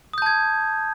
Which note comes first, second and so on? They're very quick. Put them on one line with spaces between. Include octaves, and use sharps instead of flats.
D#6 G6 A5 G#6